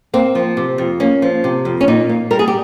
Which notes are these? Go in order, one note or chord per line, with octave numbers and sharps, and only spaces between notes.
A#3 C4
F3
C3
F2
A#3 C#4
F3
C3
F2
C#4
A#2 D#4
A#3
G3 A#4
G#4
G4